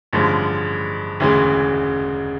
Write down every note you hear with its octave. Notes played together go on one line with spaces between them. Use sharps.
A1 G2 D3 F3 G#3
E1 D2 C#3 E3 G#3